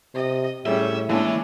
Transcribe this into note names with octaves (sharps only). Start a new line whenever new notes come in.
C3 D#5
A2 G3 C#4 G#4 E5
E3 G#3 A#3 C#4 D4 E4 E5